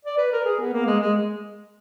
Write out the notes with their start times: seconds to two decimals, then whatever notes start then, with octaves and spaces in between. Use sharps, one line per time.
0.05 D5
0.18 B4
0.32 A#4
0.45 G#4
0.60 B3
0.73 A#3
0.86 G#3
1.00 G#3